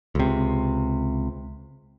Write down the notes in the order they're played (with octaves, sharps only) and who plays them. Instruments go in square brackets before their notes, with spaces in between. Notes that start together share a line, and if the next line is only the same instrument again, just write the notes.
[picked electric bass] C#2 C3